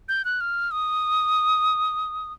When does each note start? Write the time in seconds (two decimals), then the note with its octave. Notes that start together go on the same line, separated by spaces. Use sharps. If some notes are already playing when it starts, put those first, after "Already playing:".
0.09 G6
0.25 F#6
0.41 F6
0.71 D#6